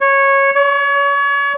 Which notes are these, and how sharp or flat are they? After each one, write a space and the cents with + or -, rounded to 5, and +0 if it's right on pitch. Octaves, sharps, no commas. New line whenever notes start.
C#5 -10
C#5 +35